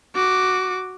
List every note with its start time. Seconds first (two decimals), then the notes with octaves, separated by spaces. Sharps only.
0.15 F#4 D6